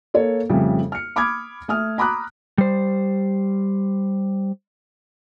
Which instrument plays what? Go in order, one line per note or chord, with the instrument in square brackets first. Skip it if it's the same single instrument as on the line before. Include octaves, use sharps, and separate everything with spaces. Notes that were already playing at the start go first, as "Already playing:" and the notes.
[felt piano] A#3 A4 C#5
F2 C#3 G3 A3
F6 C#7
B5 D6 D#6 F6 G#6
A3 D#6 F6
A#5 B5 D6 D#6 F#6
[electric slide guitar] G3 C5